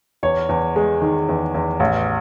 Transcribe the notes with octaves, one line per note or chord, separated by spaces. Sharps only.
E2 C#5
E2
G#3
D#3
E2
E2
A1